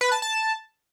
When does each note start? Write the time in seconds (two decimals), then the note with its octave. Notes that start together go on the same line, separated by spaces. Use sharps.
0.01 B4
0.12 A5
0.22 A5